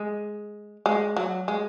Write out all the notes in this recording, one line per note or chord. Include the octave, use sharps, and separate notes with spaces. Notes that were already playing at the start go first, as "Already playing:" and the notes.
Already playing: G#3
G#3
F#3
G#3